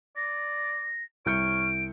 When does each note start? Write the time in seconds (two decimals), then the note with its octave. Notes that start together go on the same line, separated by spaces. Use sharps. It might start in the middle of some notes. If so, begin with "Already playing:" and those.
0.16 D5 A#6
1.26 C2 C#5 F6 G6 C#7 D7